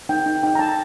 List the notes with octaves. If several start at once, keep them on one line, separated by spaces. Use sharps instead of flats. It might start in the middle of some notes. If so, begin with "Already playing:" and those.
D#4 G5
D#4
D#4 G5
A#5
D#4 A5